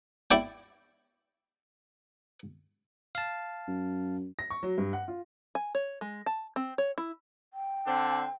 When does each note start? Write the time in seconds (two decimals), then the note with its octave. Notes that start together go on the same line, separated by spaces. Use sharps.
0.31 E4 D5 G5
3.15 F5 A5
3.68 F#2
4.39 A#6
4.50 C#6
4.63 F#3
4.78 G2
4.93 F#5
5.08 F4
5.55 G#5
5.75 C#5
6.01 G#3
6.26 A5
6.56 C4
6.78 C#5
6.98 E4
7.54 G5
7.86 D3 C4 D4